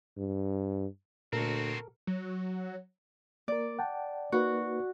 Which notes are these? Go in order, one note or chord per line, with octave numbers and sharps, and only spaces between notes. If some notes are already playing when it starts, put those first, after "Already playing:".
G2
D2 A#2 C4 F#4 A4 A#4
F#3
A#3 A#4 D5
F#5 G5 A5
A#3 D#4 F#4 B4